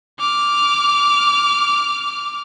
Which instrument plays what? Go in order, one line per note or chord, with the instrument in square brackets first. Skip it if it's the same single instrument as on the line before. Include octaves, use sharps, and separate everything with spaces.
[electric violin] D6 F6